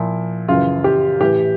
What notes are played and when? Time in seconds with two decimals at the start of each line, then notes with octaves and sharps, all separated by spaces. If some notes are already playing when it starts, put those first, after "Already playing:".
Already playing: A#2 F3 E4
0.48 F#2 C#3 E3 F4
0.84 G4
1.21 A2 E3 G4